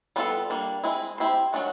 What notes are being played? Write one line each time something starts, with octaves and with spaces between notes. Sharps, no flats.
G3 B3 D4 F4 A4
G3 A#3 D4
G#3 C4 E4
C4 E4 G4 C5
D#3 F#3 A3 D4 F#4